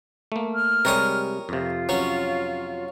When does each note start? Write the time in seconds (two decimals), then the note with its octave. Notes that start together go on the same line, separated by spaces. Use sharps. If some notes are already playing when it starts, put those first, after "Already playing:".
0.32 A3 A#3
0.55 F6
0.85 C3 G3 G#3 A#4 C#5 D#6
1.49 F2 C3 F4
1.89 F#3 C#4